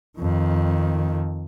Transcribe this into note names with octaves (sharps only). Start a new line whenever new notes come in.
F2 D#3